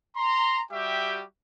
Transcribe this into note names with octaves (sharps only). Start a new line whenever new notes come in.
A#5 C6
G3 F#4 G4 E5 G5